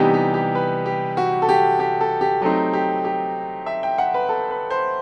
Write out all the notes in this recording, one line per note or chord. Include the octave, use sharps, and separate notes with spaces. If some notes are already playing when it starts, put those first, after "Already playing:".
Already playing: C3 E3 G3 B3 D#4 G4
G4
G4
B4
G4
F#4
A4
G4
G4
A4
G4
F#3 A3 C4 D#4 G4
G4
G4
E5
G5
F#5
B4
A4
B4
C5